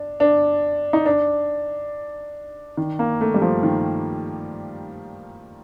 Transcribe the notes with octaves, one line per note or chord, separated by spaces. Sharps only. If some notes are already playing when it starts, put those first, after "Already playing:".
Already playing: D4
D4
D#4
D4
D#3
A#3
A3
G3
F3
D#3